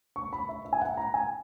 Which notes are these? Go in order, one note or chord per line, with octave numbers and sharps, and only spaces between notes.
C#6
B5
E5
E5
G#5
F#5
A#5
G#5